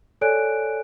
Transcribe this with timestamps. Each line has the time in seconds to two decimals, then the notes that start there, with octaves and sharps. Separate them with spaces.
0.21 A4 C#5 D5 G#5 F#6 D7